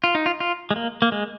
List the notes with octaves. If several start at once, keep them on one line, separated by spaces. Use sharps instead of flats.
F4
D#4
F4
F4
G#3
A#3
A#3
G#3